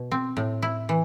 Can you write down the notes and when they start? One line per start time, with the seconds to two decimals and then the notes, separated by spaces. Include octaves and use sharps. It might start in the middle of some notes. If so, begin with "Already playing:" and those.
Already playing: B2
0.11 C4
0.37 A2
0.62 E4
0.89 E3